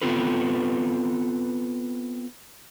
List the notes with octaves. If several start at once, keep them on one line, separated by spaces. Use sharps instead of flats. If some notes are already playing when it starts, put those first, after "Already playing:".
B3 C4 F4 A4 B4